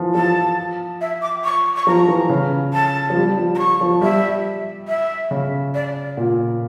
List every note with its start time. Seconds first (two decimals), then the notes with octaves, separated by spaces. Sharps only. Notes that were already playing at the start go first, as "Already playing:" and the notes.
Already playing: E3 F3
0.15 F3 A5
1.01 E5
1.22 D6
1.44 C#6
1.76 C#6
1.87 F3 A#5
2.08 E3
2.29 C#3
2.74 A5
3.10 F3
3.16 G3
3.37 F3
3.55 A#5
3.59 C#6
3.81 F3
4.01 G3 E5
4.88 E5
5.31 C#3
5.74 D5
6.17 A#2